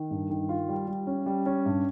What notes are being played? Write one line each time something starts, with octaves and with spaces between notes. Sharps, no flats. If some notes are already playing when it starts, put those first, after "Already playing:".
Already playing: D#3
G2
D#3
F4
G3
G3
C#4
G3
C#4
G2